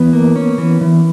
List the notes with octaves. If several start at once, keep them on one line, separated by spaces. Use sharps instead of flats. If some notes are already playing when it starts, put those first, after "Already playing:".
Already playing: E3 B3 B4
A#3
C#4
E3
E3